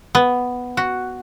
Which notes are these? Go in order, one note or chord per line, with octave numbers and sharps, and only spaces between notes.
B3
F#4